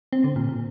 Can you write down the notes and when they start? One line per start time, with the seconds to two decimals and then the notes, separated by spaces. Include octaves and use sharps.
0.13 C4
0.24 D3
0.36 A#2
0.49 A#2